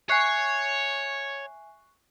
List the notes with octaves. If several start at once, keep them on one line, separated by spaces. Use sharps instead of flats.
C#5 E5 G#5 C#6 F#6 C7